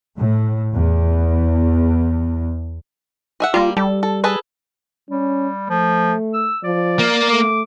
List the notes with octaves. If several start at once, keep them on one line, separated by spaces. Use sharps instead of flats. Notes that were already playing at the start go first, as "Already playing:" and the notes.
A2
E2
G#4 E5 F#5
G3 A#3 F4
G3 A4
A4
G#4 A4 B4
G3 C#4
F3 A3
E6
F3 D5
A#3
A3 D6